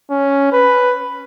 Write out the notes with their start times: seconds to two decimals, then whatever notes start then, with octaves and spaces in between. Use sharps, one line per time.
0.10 C#4
0.52 B4